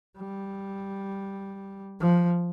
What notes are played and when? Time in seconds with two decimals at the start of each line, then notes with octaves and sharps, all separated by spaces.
0.17 G3
2.00 F3